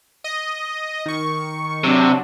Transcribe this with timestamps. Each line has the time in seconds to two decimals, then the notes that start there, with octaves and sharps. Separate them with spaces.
0.24 D#5
1.06 D#3 C#6
1.84 C3 F#3 D4